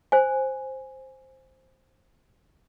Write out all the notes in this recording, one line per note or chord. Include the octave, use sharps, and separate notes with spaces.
C5 G#5